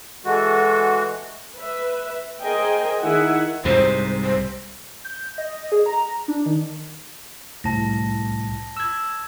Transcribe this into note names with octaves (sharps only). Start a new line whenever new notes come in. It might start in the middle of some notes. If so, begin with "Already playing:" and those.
E3 G#3 F#4 A4
B4 E5
G#4 A#4 C5 D#5 G5 G#5
D#3 E4 G#4 E5 F#5 G#5
C2 G#2 C3 C5
C5
G6
D#5
G#4
A#5
D4
D#3
C2 A2 A5 A#6
E6 G#6